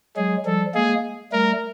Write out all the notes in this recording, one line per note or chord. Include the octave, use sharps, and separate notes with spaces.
F#3 G#3 G#4
F3 G3 A4
G#3 A#3 G#4
G3 A3 A#4